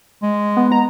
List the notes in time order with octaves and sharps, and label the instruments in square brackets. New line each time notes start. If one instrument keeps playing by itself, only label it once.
[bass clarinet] G#3
[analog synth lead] B3
A#5